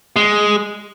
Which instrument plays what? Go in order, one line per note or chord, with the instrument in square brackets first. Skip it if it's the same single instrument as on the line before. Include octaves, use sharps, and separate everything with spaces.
[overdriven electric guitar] G#3